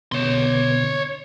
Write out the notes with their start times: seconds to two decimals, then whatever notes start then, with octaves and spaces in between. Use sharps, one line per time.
0.12 B2 D3 B3 C#5 C6